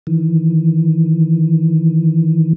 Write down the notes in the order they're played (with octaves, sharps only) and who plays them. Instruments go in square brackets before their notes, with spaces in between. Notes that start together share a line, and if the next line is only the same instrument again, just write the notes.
[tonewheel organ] D#3 E3